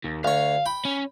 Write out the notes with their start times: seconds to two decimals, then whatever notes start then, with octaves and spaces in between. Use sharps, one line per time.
0.05 D#2
0.24 D2 C#5 F5
0.66 G5 B5
0.85 C#4